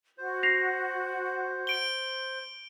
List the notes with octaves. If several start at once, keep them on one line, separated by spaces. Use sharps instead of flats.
F#4 C5
A#6 C7 F7
D7 G7